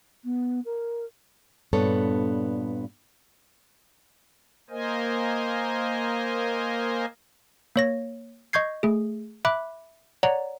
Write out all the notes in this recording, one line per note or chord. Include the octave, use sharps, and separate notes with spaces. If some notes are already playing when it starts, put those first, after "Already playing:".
B3
A#4
G2 A#2 B3 D4 A4 C#5
A#3 A#4 C5 D#5 G#5
A#3 C#5 A#6
D#5 C#6 G6 G#6 C7
A3 G#4
E5 B5 D6 F#6
C#5 D5 F#5 A#5